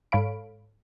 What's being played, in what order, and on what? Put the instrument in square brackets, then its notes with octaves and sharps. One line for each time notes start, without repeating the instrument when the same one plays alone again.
[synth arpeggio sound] G#2 A4 C#5 F5 B5 D7